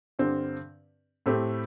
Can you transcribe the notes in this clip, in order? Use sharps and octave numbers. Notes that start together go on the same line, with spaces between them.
G2 D3 C4 G4
A2 A3 C4 G4